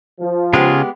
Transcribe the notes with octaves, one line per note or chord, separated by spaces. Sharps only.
F3
C#3 G#3 B3 F4 G4 G#4